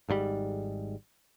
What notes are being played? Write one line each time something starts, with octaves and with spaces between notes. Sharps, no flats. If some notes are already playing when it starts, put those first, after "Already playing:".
G#1 G#2 B2 G3